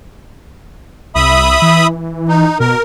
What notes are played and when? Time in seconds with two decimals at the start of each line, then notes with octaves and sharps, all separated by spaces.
1.15 C2 E5 B5 D#6
1.62 E3
2.29 D#4
2.60 B2 A#4